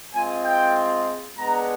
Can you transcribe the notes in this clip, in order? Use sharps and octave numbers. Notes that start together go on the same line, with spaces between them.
G#3 C4 F4 G#5
G5
G#3 B3 D4 A#5